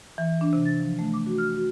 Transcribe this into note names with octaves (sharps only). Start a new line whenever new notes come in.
E3
D4
C3
A6
F3
A3
D6
F#4
F6
F#4